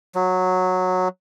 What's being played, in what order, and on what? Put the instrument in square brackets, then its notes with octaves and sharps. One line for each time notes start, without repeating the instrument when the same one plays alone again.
[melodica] F#3